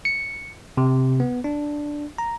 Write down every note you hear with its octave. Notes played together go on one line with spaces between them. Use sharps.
C#7
C3
B3
D4
A#5